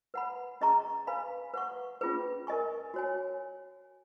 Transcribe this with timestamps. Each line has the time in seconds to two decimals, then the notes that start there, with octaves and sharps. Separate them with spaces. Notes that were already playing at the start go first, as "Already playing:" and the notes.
0.14 B4 F#5 B5
0.61 C#4 G#4 D#5 A#5 C#6
1.07 B4 F5 G#5 B5
1.54 B4 F#5 C#6
2.01 C#4 F4 G#4 B4
2.47 A#4 D#5 G#5 C#6
2.94 F#4 C#5 G#5